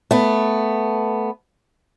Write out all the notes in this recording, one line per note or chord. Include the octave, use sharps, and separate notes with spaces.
A3 B3